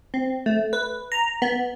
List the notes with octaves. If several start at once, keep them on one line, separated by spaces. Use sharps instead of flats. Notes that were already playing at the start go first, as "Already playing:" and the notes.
C4
A3
B4
A#5
B3